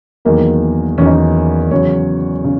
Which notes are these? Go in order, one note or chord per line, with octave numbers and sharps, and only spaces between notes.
E2 D#3 F#3 A#3
E2 D#3 F#3 C#4
D#4
C#4
E2 C#3 F#3 C#5
C#3